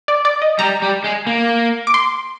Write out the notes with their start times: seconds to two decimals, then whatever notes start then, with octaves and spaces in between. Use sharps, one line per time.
0.08 D5
0.25 D5
0.42 D#5
0.59 G3 A#5
0.82 G3
1.04 G#3
1.27 A#3
1.87 D6
1.94 C6